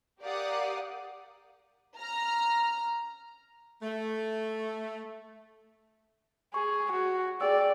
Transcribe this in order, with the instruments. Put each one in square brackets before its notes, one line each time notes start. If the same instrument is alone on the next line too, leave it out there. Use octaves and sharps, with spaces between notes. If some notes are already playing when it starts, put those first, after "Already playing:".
[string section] G4 A#4 D5 F5 F#5 D#6
A#5 F6
[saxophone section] A3
[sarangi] G#4 [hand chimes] C#6
[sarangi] F#4
[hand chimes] G#4 G5 E6 [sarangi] D5